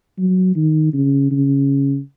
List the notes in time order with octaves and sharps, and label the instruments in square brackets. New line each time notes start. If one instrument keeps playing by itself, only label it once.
[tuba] F#3
D#3
C#3
C#3